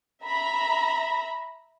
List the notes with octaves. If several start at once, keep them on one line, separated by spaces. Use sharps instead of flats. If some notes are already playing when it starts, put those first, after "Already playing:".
E5 A#5 B5